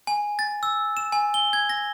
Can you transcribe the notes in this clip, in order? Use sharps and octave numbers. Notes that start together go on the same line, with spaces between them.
G#5
A6
E6
E7
G#5
G7
G#6
A#6